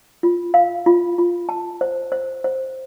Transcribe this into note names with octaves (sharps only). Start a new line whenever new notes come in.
F4
F5
F4
F4
A5
C5
C5
C5